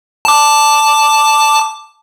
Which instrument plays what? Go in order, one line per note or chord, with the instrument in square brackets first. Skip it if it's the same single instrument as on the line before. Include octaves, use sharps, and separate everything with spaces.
[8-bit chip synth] A5 D6